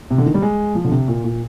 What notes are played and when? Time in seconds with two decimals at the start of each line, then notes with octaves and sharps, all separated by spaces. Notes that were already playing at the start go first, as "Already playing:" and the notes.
0.10 C3
0.18 D3
0.26 D#3
0.34 G3
0.42 G#3
0.75 F3
0.85 D3
0.91 C3
1.08 A#2
1.24 A#2